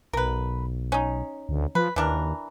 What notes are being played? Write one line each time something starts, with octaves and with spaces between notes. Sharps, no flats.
B1 A#4 B4
C#4 D#4
D2
F3 B4
D#2 E3 D4 A#4